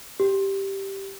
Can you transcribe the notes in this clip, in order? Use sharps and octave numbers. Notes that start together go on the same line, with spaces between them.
G4